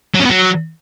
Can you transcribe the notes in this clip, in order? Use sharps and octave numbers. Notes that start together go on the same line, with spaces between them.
F#3
C#4
B3
F#3